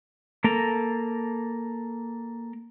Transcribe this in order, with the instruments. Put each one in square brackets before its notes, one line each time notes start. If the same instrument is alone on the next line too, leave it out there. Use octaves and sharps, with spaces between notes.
[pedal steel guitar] A#3 A4 A#5